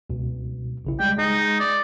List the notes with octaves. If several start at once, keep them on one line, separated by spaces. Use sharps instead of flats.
C#2 B2
A1 C#3 E4
G3 G#3 G5
G#3 D#4
D5